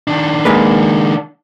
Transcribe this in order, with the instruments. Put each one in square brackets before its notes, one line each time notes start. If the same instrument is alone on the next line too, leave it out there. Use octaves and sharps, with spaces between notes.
[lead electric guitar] D#3 D4
[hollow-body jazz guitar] G#3 A#3 B4